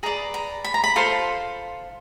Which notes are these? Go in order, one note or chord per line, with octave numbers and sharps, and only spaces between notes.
G#4 B4 D5 A#5
A#5
B5
A#5
B5
F4 A4 C5 C6